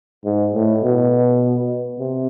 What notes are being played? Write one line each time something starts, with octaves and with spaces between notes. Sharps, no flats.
G#2
A2
B2
C3